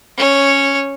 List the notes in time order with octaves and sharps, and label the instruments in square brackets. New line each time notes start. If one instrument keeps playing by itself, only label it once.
[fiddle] C#4 C#5